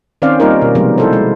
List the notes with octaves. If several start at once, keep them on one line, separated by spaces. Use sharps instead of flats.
D#3 C4 C#4 C5 D5 F5
G3 A#3 D#4 F4 A#4
B2
C3 F3 G3 G#3 B3
E4 A4 C5
G#3